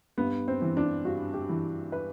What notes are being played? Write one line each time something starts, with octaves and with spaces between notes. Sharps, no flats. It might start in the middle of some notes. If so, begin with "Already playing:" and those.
G2 B3
C4
E3
D4
G2 F#4
G4
E3
B4